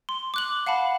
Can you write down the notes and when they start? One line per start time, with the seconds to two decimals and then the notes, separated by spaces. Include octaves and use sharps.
0.09 C6
0.34 D6 F#6 F#7
0.66 F5 F#5 A5 B5